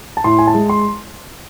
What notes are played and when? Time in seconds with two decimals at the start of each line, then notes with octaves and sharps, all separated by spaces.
0.17 A5
0.24 A2 C6
0.38 G#5
0.47 A5
0.54 G#3
0.69 C6